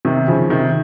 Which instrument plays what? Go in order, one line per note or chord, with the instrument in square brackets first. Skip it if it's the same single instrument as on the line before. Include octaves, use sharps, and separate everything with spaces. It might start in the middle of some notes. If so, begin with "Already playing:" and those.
[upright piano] C3 D#3
C#3 F3
C3 D#3